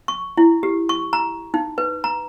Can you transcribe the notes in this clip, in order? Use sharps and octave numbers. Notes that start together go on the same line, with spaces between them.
C#6
E4
G4
C#6
A#5
D#4
B4
A#5